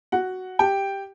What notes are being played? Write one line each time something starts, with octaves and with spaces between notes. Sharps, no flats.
F#4 F#5
G4 G5